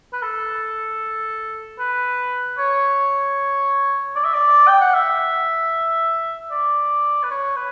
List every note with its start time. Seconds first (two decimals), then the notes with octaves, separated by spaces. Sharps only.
0.13 B4
0.22 A4
1.79 B4
2.58 C#5
4.16 D5
4.24 E5
4.34 D5
4.68 G5
4.81 F#5
4.94 E5
6.51 D5
7.23 B4
7.31 C#5
7.57 B4